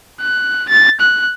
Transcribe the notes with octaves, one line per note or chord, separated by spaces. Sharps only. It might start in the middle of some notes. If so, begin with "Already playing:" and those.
F#6
A6
F#6